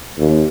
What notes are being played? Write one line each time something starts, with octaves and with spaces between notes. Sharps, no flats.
D#2